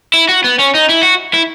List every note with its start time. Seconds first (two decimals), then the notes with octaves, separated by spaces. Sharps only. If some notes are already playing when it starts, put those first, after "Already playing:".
0.14 E4
0.29 F#4
0.44 B3
0.59 C#4
0.74 D#4
0.89 E4
1.03 F#4
1.34 E4